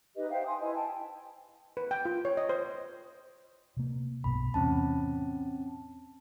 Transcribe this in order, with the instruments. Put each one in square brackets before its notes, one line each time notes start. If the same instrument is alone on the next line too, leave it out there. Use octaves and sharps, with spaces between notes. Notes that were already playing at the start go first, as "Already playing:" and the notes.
[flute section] D#4 G4 B4 D#5
C5 E5 F5 G5
G#5 C6 D#6
E4 B4 D#5 G#5
G5 A5
[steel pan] B4
G5
F4
C#5
D#5
C5
[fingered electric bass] C3 A#3
[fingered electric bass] B1 G2 B2 [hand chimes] B5
[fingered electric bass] E2 A2 C3 [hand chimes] C4 C#4 A5